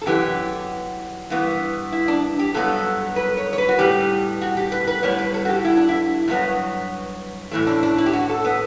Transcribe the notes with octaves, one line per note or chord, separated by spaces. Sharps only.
A4
F#2 E3 B3 G4
G2 E3 B3
E4
D4
G4
G2 F#3 B3 A4
B4
C#5
C#5
B4
F#4
A2 G3 B3 G4
F#4
G4
B4
B4
A2 G3 B3 C#5
B4
A4
F#4
G4
E4
D4
E4
G2 F#3 B3
A2 E3 A3
D4
D4
E4
G4
F#4
A4
B3